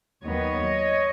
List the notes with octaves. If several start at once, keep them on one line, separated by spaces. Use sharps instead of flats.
D#2 D#3 F#3 B3 C#5 D#5